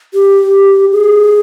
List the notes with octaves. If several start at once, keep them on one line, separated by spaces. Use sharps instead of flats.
G4
G#4